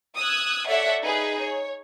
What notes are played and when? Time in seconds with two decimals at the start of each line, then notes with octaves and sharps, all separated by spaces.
0.16 D#6 E6 F#6 G#6
0.68 A4 C#5 D5 E5 F#5
1.03 D#4 G#4 B4
1.42 C#5